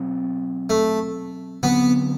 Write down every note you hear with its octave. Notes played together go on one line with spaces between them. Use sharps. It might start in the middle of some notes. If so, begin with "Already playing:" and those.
Already playing: B2 F#3 C4
A3
D3 F#3 B3 C4